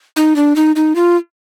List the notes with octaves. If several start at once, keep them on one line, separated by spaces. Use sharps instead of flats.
D#4
D4
D#4
D#4
F4